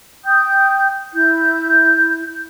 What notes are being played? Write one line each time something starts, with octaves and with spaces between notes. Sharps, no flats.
G5 D#6 G6
E4 G6